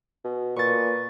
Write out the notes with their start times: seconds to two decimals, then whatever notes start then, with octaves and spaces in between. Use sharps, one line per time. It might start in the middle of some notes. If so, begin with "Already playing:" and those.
0.24 B2
0.56 A#2 B4 C#6 A6